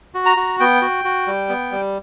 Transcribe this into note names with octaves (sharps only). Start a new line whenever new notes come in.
F#4
A#5
F#4
B3 G5
F#4
F#4
G3
B3
G3